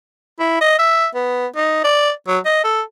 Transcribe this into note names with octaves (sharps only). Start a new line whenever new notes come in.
E4
D#5
E5
B3
D#4
D5
F#3
D#5
A4